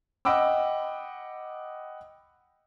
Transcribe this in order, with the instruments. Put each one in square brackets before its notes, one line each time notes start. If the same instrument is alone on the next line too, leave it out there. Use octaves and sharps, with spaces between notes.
[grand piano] D#5 F#5 G5 B5 D6 E6